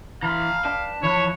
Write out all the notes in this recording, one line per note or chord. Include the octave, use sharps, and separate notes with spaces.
E3 F5 A#5 B5
D4 B4 G5 A5
E3 F3 C#5 B5 F#6